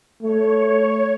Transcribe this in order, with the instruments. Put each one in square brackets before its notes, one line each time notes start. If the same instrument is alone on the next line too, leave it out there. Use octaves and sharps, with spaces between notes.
[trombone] A3 [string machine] C#5